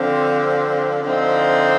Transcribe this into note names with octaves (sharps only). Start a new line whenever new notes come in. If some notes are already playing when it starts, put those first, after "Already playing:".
Already playing: D3 F3 C4
D3 F3 C4 D#4